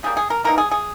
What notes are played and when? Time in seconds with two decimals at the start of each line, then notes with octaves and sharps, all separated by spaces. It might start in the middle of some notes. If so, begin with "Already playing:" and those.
0.03 C#3 G3 A#3 G#4
0.17 G#4
0.30 A#4
0.44 E3 A#3 D#4 A#4
0.58 G#4
0.71 G#4